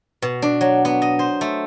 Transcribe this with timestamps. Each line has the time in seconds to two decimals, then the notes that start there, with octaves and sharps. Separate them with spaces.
0.22 B2
0.42 D4
0.61 F#3
0.85 B3
1.02 D#5
1.19 C5
1.41 A3